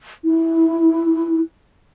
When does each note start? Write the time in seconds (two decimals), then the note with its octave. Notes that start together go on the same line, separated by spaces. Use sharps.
0.25 E4